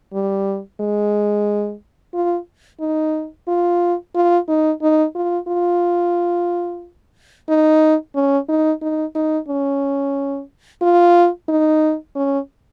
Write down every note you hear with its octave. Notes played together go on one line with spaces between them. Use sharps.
G3
G#3
F4
D#4
F4
F4
D#4
D#4
F4
F4
D#4
C#4
D#4
D#4
D#4
C#4
F4
D#4
C#4